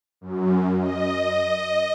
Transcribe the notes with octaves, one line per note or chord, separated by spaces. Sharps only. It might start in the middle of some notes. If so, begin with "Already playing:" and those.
F#2
D#5